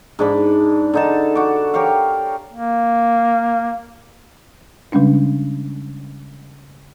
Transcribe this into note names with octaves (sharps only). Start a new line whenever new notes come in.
G#2 D4 B5
D3 D#4 A5
F#4 D6
G4 A#4 C#5 F5
A#3
C#3 G3 G#3 C#4 D4